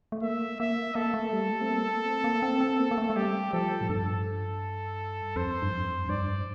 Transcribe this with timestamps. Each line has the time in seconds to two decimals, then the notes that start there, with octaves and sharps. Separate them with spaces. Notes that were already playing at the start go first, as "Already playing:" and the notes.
0.12 A3
0.22 A#3 E5
0.60 A#3 E5
0.95 A#3 A4
1.14 A3
1.33 G3
1.51 A3
1.61 C4
1.69 A#3
1.87 A3
2.06 C4
2.24 A#3
2.42 C4
2.61 C4
2.79 A#3
2.91 A#3
2.98 A3
3.10 A3
3.16 G3 G4
3.53 F3 A4
3.81 A2
3.89 G2 A4
5.36 F2 C5
5.62 G2
5.73 F2
6.09 G2 D5